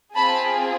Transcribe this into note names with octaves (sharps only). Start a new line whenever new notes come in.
C4 F4 G#4 A5 B5